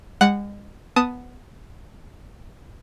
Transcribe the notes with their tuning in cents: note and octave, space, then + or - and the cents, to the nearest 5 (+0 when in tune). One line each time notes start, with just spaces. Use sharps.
G#3 -40 F#5 +0
B3 +0 A5 +0 D#6 +0